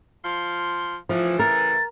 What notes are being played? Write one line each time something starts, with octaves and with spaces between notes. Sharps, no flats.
F3 F5 C6
A2 C#3 E3 F3
A#4 A6